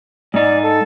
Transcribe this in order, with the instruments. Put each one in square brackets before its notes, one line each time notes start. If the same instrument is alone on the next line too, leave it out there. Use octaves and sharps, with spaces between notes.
[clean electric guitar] G#2 D#4 [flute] D5
[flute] A4